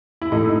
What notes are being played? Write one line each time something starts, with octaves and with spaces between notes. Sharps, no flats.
E4
A2 D#4